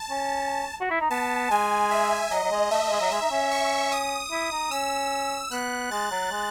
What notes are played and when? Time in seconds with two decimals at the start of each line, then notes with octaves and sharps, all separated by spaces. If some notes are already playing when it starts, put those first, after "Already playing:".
Already playing: A5
0.10 C#4
0.81 F#4
0.91 E4
1.01 D#4
1.10 B3 A5
1.51 G#3 G#5
1.91 E5
2.31 F#3 D#5
2.44 F#3
2.51 G#3
2.71 A3 E5
2.81 A3
2.91 G#3
3.01 F#3
3.11 G#3 E5
3.22 D#4
3.31 C#4
3.51 C#6
3.92 D#6
4.31 E4
4.51 D#4
4.71 C#4 E6
5.51 B3 F#6
5.91 G#3 A6
6.11 F#3
6.31 G#3